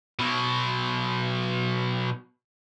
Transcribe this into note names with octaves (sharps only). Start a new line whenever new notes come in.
B2 F#3